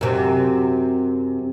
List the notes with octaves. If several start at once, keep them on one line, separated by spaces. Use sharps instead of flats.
F#2 C3